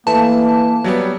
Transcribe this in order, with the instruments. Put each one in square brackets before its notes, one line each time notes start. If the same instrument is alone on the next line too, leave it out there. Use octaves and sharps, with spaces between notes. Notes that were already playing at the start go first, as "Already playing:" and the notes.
[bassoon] E3 [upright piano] A3 [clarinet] A#3 [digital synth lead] A5
[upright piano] F#3 G3 B3